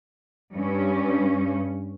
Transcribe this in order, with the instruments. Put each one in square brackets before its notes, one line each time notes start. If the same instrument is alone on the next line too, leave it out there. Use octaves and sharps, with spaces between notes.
[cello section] G2 C#4